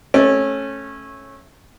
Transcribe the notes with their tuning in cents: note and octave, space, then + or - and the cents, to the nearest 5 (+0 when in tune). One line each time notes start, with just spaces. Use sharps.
A3 -15 C#4 -20